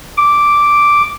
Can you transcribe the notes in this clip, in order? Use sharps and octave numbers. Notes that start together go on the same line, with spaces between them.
D6